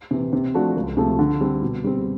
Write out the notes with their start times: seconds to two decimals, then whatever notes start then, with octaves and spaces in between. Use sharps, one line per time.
0.11 C3 E3
0.33 C3
0.54 F3 A3 D4 F#4
0.76 C#2
0.97 C3 F3 A3
1.19 D3
1.41 G3 C4
1.62 B2
1.84 G3 C4